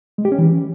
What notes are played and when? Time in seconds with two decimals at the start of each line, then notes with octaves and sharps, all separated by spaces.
0.18 G#3
0.25 G4
0.32 C#4
0.38 E3